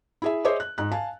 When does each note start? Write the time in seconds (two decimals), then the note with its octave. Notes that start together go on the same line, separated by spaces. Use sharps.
0.22 E4 G#4 E5
0.45 G#4 C5 C#5 D#5 E5 D6
0.60 F#6
0.78 G#2 F#6
0.92 F5 G#5 A5